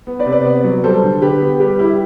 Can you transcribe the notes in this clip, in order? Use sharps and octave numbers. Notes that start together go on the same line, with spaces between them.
B3
B4 D5
C3
B4 D5
B3
F#3
G3 A4 C5
D3
D3 G4 B4
B3
G3 G4 B4
G3 E4 G4